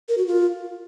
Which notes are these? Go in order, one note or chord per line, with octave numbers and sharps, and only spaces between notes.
A#4
F#4
F4